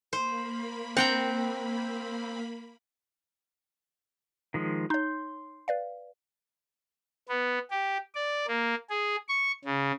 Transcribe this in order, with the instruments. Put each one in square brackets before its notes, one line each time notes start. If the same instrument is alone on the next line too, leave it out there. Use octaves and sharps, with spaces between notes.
[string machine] A#3 B5 [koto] C5
[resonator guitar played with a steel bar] C4 [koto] F#5 G5 A#5
[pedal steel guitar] D#3 F3 G#3
[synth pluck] D#4 C#5 [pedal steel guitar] C6 G6
[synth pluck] B4 D5 F5
[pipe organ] B3
G4
D5
A#3
G#4
C#6
C#3